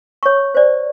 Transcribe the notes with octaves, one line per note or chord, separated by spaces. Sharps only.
C#5 C#6
C5 D5